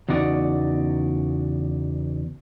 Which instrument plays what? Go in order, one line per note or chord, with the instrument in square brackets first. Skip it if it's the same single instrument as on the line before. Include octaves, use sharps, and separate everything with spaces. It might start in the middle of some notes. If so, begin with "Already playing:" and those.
[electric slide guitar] E2 C#3 D#4 F#4 D5